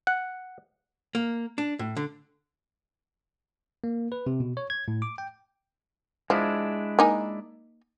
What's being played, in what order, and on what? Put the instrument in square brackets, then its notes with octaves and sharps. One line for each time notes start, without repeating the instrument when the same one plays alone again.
[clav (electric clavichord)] F#5
[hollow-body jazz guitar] A#3
D4
A2
D3
[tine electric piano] A#3
B4
C3
B2
C#5
G#6
A2
D6
G5
[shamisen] F3 [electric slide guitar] G#3 D4 E4
[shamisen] A#3 D#4 G#5